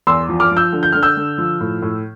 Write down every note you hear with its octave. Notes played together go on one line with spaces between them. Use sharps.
E2 C6 E6
F3
D6 F6
F3
E6 G6
D3
G6
D3 F6
E6 G6
D3
F3
A2
A2